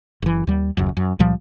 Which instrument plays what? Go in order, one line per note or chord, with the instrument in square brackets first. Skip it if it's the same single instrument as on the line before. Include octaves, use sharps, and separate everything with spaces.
[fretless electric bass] F#1 E3
D#2 G3
D#1 C#2 F#2
F#2
C#2 A#2 F3 G3